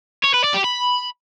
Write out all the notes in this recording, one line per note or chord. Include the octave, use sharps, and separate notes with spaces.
C#5
B4
D5
G4
B5